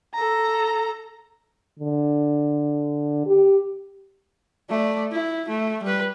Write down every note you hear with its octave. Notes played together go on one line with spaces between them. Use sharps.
A4 A#5
D3
G4
A3 D5
E4
A3
G3 B4